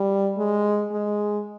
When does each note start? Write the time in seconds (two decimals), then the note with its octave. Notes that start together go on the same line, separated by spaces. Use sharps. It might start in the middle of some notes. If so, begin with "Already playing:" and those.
Already playing: G3
0.38 G#3
0.92 G#3